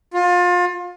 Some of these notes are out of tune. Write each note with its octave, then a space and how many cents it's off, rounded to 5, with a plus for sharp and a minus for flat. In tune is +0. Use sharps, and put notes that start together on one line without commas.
F4 +30